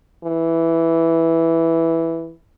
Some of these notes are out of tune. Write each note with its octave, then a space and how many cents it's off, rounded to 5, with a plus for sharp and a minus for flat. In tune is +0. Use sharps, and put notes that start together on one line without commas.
E3 +0